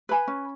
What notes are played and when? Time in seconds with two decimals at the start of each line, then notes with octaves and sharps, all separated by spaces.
0.09 B4 G#5 B5
0.28 C#4